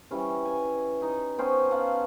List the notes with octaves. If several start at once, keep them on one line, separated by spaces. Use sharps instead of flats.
E3 G3 C#4
G#5
D#4 D#5
B3 C#4 C5 G5
F5 F#5 A5